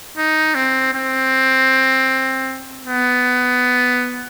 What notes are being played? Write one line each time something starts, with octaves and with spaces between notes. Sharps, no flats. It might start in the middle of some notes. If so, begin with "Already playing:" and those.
D#4
C4
C4
B3